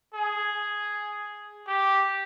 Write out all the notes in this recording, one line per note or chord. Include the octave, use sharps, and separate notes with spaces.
G#4
G4